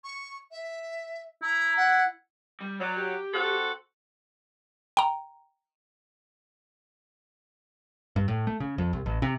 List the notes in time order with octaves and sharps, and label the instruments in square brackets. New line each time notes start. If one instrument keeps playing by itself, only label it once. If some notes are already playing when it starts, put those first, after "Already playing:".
[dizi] C#6
E5
[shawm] E4 [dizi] A#5
[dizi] F#5
[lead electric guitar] G3
[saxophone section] F#3 [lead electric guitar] D5
[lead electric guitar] G4
[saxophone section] C4 F#4 A4
[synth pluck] G5 A#5
[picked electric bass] G2
A2
A3
C#3
F2
C2
A1
C3